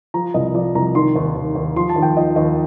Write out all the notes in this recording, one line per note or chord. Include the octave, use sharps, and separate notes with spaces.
F3 A#5
C2 D#5
F3 D5
C2 A#5
D#3 C6
D#2
D#2
D#2
F3 C6
A5
D#2
G5
F3 D#5
D#2 D#5